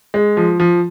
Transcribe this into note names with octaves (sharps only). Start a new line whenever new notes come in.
G#3
F3
F3